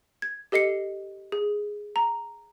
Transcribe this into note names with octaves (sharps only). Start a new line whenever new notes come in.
G#6
G4 A4 D#5 C7 C#7
G#4
A#5